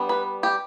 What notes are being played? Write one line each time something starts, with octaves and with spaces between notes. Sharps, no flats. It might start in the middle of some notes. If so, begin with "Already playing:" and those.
Already playing: G3 B3 D4
B4
G4